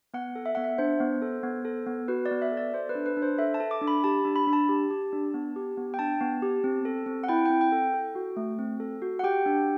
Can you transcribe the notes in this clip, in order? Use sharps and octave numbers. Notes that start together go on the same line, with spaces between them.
B3 F#5
A4
E5
B3 F#5
E5
D4 C5
B3
A4
B3
A4
B3
F#4 B4
D5
B3
E5
A4
D5
A4 C5
B4
D4
B4
D4
C5
A4 E5
A5
A4
D6
D4
B5
G4 A5
D4
B5
D4
A5
G4
G4
D4
B3
G4
B3
G5
D4 A5
B3
G4
C4
A4
C4
F#5
E4 G5
C4 G5
G5
A4
A4
F#4
A3
C4
A4
F#4
F#5
G4 G5
D4